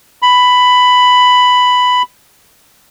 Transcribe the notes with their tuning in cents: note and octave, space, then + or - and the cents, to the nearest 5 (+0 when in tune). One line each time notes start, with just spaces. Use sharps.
B5 +10